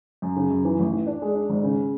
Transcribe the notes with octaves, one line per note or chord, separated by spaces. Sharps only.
F#2
C#3
F#2
E3
A1
E3
D4
G#3
D4
G#1
C#3